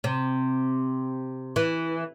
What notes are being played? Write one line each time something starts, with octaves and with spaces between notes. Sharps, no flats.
C3
E3